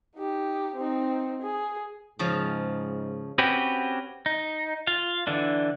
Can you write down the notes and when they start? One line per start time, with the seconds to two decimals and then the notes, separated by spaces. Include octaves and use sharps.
0.16 D#4 G4
0.76 C4 D#4
1.42 G#4
2.19 G#2 C#3 F3
3.38 C4 C#4 F#4 G4 B4
4.26 D#4
4.87 F4 F5
5.27 D3 E3 D4